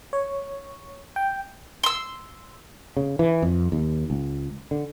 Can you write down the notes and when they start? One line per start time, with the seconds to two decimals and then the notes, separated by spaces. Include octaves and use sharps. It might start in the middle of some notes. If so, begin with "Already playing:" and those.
0.13 C#5
1.16 G5
1.83 C6 E6
2.97 C#3
3.19 E3
3.42 F2
3.72 D#2
4.10 C#2
4.71 D3